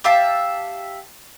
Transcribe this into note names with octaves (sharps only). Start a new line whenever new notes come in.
G4 E5 F5 A5